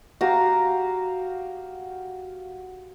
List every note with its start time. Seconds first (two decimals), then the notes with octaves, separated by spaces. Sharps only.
0.21 F#4 G4 F5 A#5